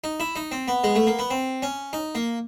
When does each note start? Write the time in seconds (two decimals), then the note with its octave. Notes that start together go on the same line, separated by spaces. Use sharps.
0.04 D#4
0.20 E4
0.36 D#4
0.51 C4
0.68 B3
0.84 G#3
0.96 A3
1.07 A#3
1.19 B3
1.31 C4
1.62 C#4
1.93 D#4
2.15 A#3